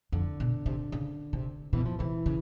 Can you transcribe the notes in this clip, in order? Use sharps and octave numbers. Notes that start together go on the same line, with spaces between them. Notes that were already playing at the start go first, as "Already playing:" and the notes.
F2 D3
B2
C3
C#3
C3
B2 E3
F3
C3 E3
C#3